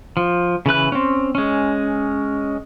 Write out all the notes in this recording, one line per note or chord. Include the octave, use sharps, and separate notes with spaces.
F3
C#3 E3 B4 F#6
C4 C#4
G#3 C#4